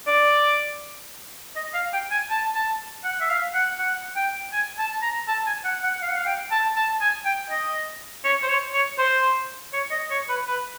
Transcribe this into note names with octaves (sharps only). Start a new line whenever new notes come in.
D5
D#5
F5
G5
G#5
A5
A5
F#5
E5
F5
F#5
F#5
G5
G#5
A5
A#5
A5
G#5
F#5
F#5
F5
F#5
F5
G5
A5
A5
G#5
G5
D#5
C#5
C5
C#5
C#5
C5
C#5
D#5
C#5
B4
B4